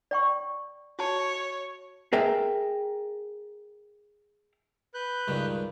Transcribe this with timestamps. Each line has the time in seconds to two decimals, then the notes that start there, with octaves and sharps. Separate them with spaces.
0.11 D5 G5 C#6
0.99 F#4 C#5 A5
2.13 G#4 A#4 E5 G5
4.94 B4 F#6 G6
5.28 C#2 G2 D#3